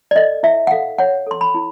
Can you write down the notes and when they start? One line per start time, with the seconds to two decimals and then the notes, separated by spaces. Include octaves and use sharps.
0.11 D5
0.15 A4 D#5
0.43 E4 E5
0.67 F#5
0.71 A4 F5
0.98 C#5 F#5
1.27 A4 C6
1.41 B5
1.54 E4